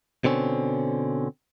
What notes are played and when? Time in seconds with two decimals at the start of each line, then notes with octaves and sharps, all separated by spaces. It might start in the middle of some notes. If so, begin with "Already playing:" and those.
0.24 B2 D3 C4 C#4